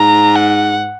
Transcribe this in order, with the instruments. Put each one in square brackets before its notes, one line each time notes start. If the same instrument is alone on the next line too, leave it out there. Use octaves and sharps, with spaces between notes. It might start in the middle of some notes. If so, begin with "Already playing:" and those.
Already playing: [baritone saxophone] G#2 [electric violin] A#5
[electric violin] F#5